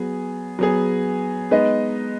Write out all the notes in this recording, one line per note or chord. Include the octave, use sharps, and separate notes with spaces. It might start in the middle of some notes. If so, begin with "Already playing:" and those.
Already playing: F#3 B3 G#4
F#3 B3 G#4
G#3 B3 D#4 B4 D#5